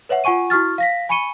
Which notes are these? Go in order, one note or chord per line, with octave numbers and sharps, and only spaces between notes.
B4 C#5 E5 F#5
F4 F#5 G#5 C#6 D#7
E4 F#4 C#6 F6 A6
F5 A#6 B6
G#5 B5 C#6 C#7 D#7 G7